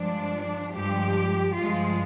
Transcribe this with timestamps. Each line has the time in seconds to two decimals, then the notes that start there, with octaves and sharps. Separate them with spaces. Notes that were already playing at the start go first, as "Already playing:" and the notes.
Already playing: G2 F3 G#3 D4
0.73 G2 F3 G#3 G4
1.55 G2 F3 G#3 F4